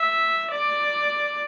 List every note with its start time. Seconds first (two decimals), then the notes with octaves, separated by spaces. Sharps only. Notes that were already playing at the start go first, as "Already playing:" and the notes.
Already playing: E5
0.50 D5